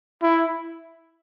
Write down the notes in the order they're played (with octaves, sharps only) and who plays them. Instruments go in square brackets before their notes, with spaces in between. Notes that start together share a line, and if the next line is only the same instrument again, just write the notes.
[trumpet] E4